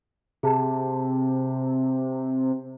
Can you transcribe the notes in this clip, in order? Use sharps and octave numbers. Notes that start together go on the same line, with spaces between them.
C3 G#4 A5